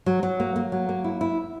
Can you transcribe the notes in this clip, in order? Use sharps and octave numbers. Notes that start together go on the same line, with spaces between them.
F#3
F#3
A#3
A#3
F#3
A#3
E4
E4